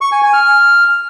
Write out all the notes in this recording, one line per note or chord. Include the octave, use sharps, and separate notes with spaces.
C#6
G#5
G#5
F6